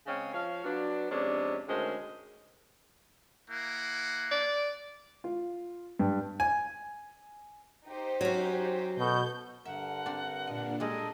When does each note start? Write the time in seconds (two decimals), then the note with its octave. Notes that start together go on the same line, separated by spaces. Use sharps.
0.06 C#3 G#3 C4 C#4
0.33 F3 C#5 F5
0.64 F#3 B3 D4
1.10 F2 C3 G#3 C#4 D4
1.68 D2 D#3 G#3 C#4 C5
3.51 A#3 E4 F#5
4.31 D5
5.24 F4
5.99 G2
6.40 G#5
7.87 D#4 G4 C5
8.21 F#3 C#4
8.98 B2 A4 G6
9.65 G2 D3 A#4 E5 F#5
10.06 C4 D4
10.47 A#2 D4 D#5
10.80 G3 G#3 G4 A4 A#4 D#5